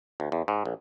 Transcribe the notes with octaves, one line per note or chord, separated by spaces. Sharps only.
D2
E2
G#2
A#1